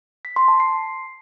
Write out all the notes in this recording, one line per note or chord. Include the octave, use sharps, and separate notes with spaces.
B6
C6
A5
C7